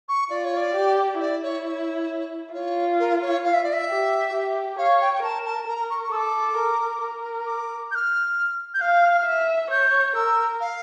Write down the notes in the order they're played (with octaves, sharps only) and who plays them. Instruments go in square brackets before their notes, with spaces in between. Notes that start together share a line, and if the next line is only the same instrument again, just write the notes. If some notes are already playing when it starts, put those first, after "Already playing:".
[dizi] C#6
[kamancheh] F4 [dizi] D5
[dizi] C#5
D5
[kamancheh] G4
[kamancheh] E4 [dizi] D5
[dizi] C#5
C#5
[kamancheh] F4 [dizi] C#5
[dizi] A#4
C#5
F5
E5
D5
E5
[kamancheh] G4
G4
[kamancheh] C#5 [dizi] F5
[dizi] G5
G5
[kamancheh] A#4 [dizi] A5
[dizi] A5
[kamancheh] A#4 [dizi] A#5
[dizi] C#6
C#6
[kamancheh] A4 [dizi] D6 E6
[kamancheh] A#4
A#4
[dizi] D6
G6
F6
G6
[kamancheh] F5 [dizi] F6
[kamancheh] E5
[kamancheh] C#5 [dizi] G6
[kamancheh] A#4 [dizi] E6
[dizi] F5